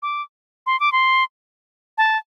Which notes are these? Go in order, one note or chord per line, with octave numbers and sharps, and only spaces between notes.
D6
C6
D6
C6
A5